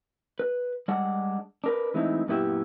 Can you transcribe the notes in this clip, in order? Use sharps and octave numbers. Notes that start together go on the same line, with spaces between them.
B4
G3 G#3 D4 F#5
D4 A#4 B4
E3 G#3 A3 C4 D#4 E4
F#2 A#2 B3 E4 G4 E5